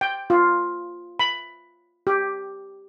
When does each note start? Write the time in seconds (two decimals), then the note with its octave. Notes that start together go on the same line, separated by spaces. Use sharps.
0.01 G5
0.30 F4
1.19 B5
2.07 G4